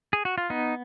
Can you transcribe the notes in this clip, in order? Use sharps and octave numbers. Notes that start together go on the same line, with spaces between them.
G#4
F#4
F4
B3 D#4